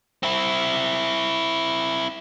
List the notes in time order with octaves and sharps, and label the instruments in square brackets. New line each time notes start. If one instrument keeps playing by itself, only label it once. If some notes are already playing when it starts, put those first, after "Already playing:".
[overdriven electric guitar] C4 E4